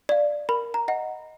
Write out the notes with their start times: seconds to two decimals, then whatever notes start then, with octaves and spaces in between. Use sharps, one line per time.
0.09 D5 F5
0.49 A#4 B5
0.74 A#5
0.88 D#5 F#5